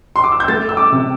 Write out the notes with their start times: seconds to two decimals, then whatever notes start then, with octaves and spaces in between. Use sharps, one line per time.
0.16 C6
0.24 D6
0.32 E6
0.40 G6
0.48 A3 A6
0.69 E6
0.77 D6
0.92 C3